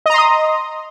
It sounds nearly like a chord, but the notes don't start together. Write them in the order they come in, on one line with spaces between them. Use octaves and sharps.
D#5 A#5 C6 D#6